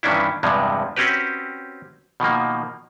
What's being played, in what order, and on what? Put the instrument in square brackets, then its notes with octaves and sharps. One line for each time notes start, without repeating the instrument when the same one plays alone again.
[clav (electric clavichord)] G2 D#3 E3 C#4 D4 E4
E2 G2 C3 F3 G#3
C4 C#4 F#4 G4 B4
B2 D#3 F3 A#3